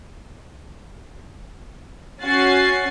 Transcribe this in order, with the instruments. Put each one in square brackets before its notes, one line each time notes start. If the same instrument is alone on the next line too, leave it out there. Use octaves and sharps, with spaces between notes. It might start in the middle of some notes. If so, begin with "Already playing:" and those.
[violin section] C#4 F#4 A6 C7